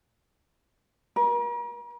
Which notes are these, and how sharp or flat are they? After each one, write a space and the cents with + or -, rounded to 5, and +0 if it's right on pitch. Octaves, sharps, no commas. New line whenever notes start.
A#4 +40